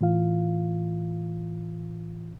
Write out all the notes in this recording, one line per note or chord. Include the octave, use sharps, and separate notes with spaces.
A2 E3 F4 F5